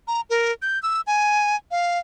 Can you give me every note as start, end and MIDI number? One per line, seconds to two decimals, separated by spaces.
0.08 0.21 82
0.30 0.52 70
0.62 0.81 91
0.83 1.01 88
1.07 1.56 80
1.71 1.99 77